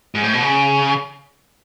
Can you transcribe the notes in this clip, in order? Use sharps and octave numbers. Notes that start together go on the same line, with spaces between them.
G#2
A2
B2
C#3